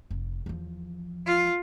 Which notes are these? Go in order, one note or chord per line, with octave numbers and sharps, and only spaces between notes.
F1
E2 F3
F4